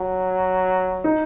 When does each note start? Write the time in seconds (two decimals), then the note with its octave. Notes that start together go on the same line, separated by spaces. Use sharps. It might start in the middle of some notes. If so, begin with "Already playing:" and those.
Already playing: F#3
1.04 D#4